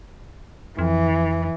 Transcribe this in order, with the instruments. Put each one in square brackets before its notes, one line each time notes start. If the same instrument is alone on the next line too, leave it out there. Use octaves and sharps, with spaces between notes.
[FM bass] F2 [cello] E3